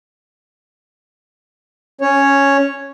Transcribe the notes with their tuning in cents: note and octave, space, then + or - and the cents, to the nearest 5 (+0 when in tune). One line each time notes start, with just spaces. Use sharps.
C#4 +0 C#5 +0